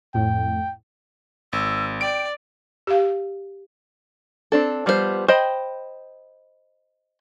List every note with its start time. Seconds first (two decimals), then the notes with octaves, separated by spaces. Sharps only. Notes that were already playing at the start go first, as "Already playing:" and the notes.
0.14 F2 A2 G5
1.53 G#1 E6
2.01 D5 G5 D7
2.87 G4 F5
4.52 C4 D4 A4
4.86 F3 G3 B3 D#4 C5
5.28 C5 D#5 G5 B5